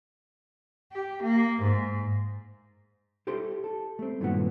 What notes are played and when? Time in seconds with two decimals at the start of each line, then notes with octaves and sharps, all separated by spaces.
0.92 G4
1.23 A#3
1.62 G#2
3.27 E4 G4 A4 C5 C6
3.64 A4
3.99 A3 C4
4.21 G2 A#2 D#3 F#3 B3 F#5